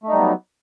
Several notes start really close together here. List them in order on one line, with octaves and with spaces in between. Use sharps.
A3 D#4 G3 B3 F#3